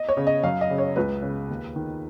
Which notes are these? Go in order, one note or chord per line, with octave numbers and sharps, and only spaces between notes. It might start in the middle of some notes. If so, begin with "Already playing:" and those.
Already playing: D#5
C#5
C#3
D#5
F#2 F5
D#5
C#3
C#5
C#2 B4
C#3
D#2
D#3